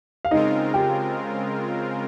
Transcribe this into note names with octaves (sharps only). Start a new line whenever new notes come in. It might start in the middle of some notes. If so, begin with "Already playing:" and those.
F5
C#3 G#3 C4 D#4 F4 A#4 D#5
G4 G5